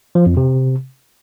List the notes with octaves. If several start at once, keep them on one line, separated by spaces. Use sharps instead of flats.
F3
F2
C3